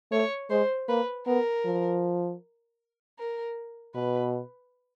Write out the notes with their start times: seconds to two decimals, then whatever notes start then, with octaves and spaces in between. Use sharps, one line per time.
0.12 A3 C#5
0.50 G#3 C5
0.88 A#3 B4
1.27 B3 A#4
1.65 F3
3.19 A#4
3.95 B2 B4